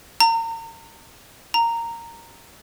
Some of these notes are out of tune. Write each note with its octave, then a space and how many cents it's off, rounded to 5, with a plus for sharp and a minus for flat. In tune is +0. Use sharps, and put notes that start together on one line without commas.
A#5 -35
A#5 -10